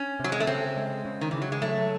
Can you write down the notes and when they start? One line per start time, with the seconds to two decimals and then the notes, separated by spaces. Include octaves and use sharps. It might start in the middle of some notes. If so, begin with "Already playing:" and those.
Already playing: C#4
0.20 C3 F#3
0.32 G#3
0.40 A3
0.47 C#3 C4
0.77 G#3
1.05 C#3
1.21 D#3
1.31 C#3 E3
1.42 F#3
1.52 G#3
1.62 F#3 A3